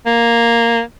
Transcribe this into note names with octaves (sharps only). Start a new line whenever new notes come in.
A#3